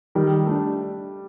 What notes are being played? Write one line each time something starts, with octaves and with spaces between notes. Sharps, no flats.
D#3 G3
A3 D4